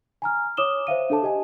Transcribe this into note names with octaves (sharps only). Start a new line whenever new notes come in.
G#5 A#5 F6
C#5 D6 D#6 E7 G7
C5 E5 F5 D#7
D4 A4 A5
G4 D#5 G#5